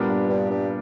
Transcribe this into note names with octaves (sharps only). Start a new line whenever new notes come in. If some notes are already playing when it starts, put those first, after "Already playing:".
Already playing: A#2 G3 B3 D4 A#4
G2
G2
G2